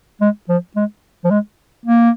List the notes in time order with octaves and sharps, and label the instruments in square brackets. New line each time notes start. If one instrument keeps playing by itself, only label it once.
[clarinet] G#3
F3
G#3
F3
G#3
A#3